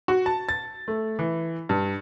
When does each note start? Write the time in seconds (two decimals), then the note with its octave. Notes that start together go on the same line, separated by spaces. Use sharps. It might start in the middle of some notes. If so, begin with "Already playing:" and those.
0.08 F#4
0.26 A5
0.49 A6
0.88 A3
1.19 E3
1.69 G2